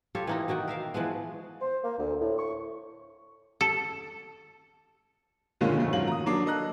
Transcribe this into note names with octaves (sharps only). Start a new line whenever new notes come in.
F4 G4 A4 C#5
E3 A#3 D#4
B2 D#3 F#4 G5
A#4 E5 F5
E3 F3 G#3 B3
C5
A#3
D2
A2
C#6
A4
A#2 D3 D#3 G#3 C#4 F4
F2 A#2 D#3 A3
G#2 D#3 F#3 F4 F#7
A#5 D#6
F#3 A#3 D4 D6 C7
A4 D#5 A#5 F#6